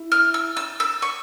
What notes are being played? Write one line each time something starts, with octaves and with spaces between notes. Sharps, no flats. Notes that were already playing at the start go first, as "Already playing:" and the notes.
Already playing: E4
F6
E6
E6
E6
C#6